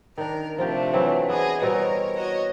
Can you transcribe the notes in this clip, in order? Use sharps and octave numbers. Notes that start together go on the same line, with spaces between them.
D#3 D4 A#4
C3 F3 A3 D4 F4 G4
E3 F#3 C4
B3 G#4 D#5
B2 G3 C4 A#4 C#5
F#4 C#5 D#5